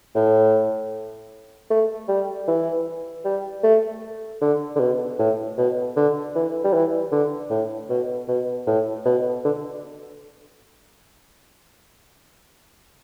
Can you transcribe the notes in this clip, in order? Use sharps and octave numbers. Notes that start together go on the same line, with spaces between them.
A2
A3
G3
E3
G3
A3
D3
D3
B2
A2
B2
D3
E3
G3
E3
D3
A2
B2
B2
A2
B2
D3